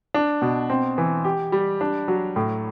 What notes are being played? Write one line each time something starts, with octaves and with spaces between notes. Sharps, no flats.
D4
B2
C4
E3
G4
G3
D4
F#3
A2